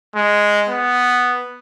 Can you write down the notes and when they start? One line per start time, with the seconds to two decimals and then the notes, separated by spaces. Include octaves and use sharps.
0.16 G#3
0.69 B3